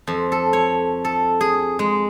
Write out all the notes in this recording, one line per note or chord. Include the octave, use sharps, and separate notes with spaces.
F2
A4
C#5
A4
G#4
G#3